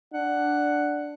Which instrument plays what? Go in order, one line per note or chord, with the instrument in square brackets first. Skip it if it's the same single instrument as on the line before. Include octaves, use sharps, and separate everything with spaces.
[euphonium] D4 [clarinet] F#5